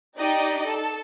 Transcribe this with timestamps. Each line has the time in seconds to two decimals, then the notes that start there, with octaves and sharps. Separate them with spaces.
0.17 D#4 G4 D5 D#5 G5
0.65 A4 A5